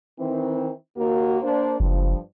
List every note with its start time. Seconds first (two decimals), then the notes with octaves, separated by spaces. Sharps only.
0.19 D#3 E3 C4
0.97 D#2 A#3 F#4
1.42 A#3 D4 C5
1.80 F#1 G2 F3